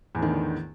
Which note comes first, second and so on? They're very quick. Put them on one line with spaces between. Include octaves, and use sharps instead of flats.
E2 A2 D#3 D3